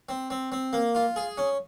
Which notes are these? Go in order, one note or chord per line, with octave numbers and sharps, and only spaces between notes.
C4
C4
C4
A#3
F4
G#4
C#4